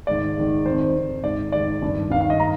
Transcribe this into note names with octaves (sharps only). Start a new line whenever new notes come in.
G#2 D#3 D5
G#2 D#3
F2 D#3 C5
F2 D#3
G#2 D#3 D5
G#2 D#3 D5
G2 D#3
G2 D#3 F5
F5
D#5
D#3 A#5